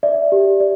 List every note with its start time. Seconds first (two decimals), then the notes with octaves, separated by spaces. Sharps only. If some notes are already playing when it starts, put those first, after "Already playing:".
0.03 D5 E5
0.32 G4
0.60 D5